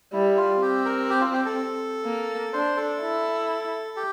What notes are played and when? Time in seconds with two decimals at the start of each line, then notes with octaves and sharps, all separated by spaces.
0.13 G3 E4
0.37 F4
0.61 C4 G4
0.85 A#4
1.10 G4
1.21 F4
1.33 G4
1.45 A4
2.05 A#3
2.53 D4 C5
2.77 A4
3.01 E4
3.97 G4